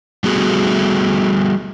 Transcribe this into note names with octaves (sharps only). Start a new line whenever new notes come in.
G3 A3 B3 F#4 G#4